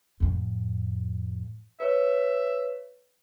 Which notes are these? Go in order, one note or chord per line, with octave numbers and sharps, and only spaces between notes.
F2 A2
B4 C#5 E5